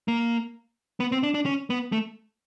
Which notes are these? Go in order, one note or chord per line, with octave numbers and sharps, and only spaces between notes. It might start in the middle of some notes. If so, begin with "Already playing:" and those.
A#3
B3
C4
D4
D4
C#4
B3
A3